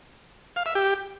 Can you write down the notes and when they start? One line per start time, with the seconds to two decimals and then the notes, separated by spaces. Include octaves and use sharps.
0.56 F5
0.66 E5
0.75 G4